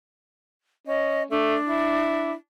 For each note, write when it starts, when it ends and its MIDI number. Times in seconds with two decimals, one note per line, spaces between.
0.87 1.25 61
0.87 1.23 75
1.31 1.56 57
1.31 2.31 62
1.67 2.34 64